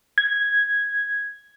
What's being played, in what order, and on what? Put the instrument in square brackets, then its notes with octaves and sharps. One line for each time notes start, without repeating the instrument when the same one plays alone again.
[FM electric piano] G#6